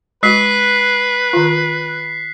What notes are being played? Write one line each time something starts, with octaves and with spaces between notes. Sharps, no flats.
G#3 F#4 B4 F#6 B6 C7
D#3 F4